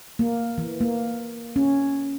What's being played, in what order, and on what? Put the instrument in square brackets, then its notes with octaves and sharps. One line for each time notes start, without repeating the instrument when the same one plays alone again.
[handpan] A#3
E3
A#3
C#4